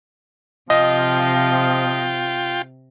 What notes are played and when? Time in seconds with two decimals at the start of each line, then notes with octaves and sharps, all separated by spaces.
0.70 C3 F3 F4 D#5 G5